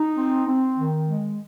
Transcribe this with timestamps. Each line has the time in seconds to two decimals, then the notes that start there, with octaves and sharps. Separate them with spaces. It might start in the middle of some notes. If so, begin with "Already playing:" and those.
Already playing: D#4
0.17 C4
0.47 C4
0.77 D#3
1.07 G#3